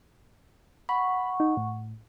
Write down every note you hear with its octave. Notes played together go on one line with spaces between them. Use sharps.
F#5 B5 C#6
D#4
A2